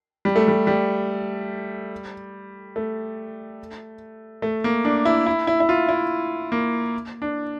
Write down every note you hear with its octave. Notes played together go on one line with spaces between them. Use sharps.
G3
A3
G3
G3
A3
A3
A#3
D4
E4
E4
E4
E4
F4
E4
A#3
D4